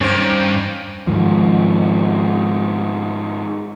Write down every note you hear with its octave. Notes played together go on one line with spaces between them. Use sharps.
G2 D#3 A#3 C#4 C5 C#5 G5
G#2 D#3 F3